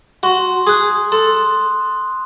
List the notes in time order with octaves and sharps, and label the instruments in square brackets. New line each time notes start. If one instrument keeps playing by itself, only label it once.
[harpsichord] F#4 [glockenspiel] C6
[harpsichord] G#4 [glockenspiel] D#6 F#6
[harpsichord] A4 [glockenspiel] C6